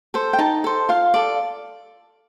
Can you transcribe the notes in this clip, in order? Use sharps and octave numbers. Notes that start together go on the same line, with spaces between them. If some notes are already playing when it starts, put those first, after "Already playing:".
A4 C5
G5
D#4 A5
A4 C5
F4 F5
A4 D5